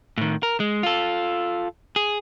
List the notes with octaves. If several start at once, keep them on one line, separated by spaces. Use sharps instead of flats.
A2 D#3
A#4
G#3
F4 A4
G#4